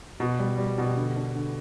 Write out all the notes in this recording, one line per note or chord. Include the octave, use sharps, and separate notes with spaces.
B2
G3
G3
B2
D3
D4
D3